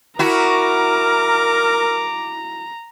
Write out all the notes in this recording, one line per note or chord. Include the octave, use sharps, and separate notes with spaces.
E4 F#4 A#4 A#5 D6